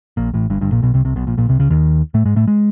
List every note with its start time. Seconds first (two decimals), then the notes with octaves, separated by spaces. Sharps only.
0.17 A#1 A#2
0.34 A1 A2
0.50 G1 G2
0.61 G1 G2
0.72 A#1 A#2
0.82 B1 B2
0.94 C2 C3
1.05 C2 C3
1.16 B1 B2
1.27 A#1 A#2
1.37 A#1 A#2
1.49 C2 C3
1.59 C#2 C#3
1.70 D#2 D#3
2.14 A2 A3
2.25 G#2 G#3
2.36 A2 A3
2.48 G#3